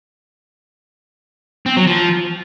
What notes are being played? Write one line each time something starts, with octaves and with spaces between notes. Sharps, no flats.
C4
F#3
F3